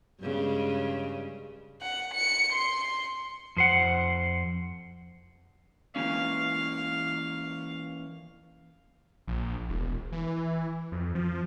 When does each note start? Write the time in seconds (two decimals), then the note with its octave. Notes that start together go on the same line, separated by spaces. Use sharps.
0.21 G2 C#3 G#3
1.82 F#5
2.14 C#7
2.52 C6
3.57 F2 C5 F#5
5.96 E3 A#3 C#4 F5
9.27 A#1
9.69 E1
10.12 E3
10.92 F2
11.15 F3